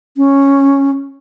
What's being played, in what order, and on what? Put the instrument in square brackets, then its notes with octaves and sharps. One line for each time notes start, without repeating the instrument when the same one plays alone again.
[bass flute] C#4